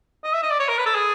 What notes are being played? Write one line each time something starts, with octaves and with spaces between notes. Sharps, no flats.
D#5
E5
D#5
D5
C#5
A#4
B4
A4
G#4